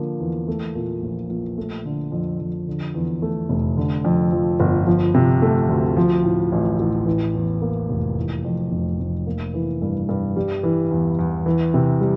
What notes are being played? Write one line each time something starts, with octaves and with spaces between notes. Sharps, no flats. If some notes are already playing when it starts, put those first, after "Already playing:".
Already playing: D3 F3 A#3
E2
A3
A#2
A#1
A#1
A3
D3
F2
F2
D3
E2
A3
F1
D3
F2
F3
G1
F3
C3
A3
D2
F3
A2
A1
A1
E3
E2
A#3
F1
E3
F2
F1
F1
A#3
E3
G2
G2
G3
E3
E2
E2
E3
C3
G3